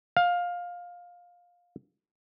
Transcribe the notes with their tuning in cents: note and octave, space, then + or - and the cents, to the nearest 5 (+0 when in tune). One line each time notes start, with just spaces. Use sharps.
F5 +15